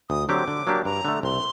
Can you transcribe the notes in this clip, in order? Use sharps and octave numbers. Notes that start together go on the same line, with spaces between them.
D2 D#6
D3 F#3 C4 G4 D6
D3
F#3 A#3 D4 G4
G2 A#5
D3 A3
C2 C6